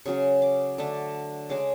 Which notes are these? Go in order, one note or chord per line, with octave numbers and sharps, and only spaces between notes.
C#3 F#3 C#4 C#6
D6
D3 A3 D4
C#3 G#3 C#4 D6